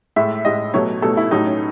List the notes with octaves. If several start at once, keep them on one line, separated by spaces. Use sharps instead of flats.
A2 G#3 E5
A2 G#3 D#5
B2 F#3 A3 C#5
B2 F#3 A3 A4
E4
A2 F#3 A3 D#4
C#4